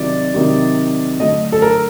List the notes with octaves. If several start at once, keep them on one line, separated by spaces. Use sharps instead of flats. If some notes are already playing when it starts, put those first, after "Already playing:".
Already playing: C3 D#3 F#3 D5
C3 D#3 F#3
D3 F#3 A3 D4 D#5
A4
A#4